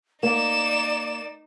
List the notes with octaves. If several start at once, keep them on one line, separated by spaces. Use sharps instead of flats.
A#3 D#4 D5 E7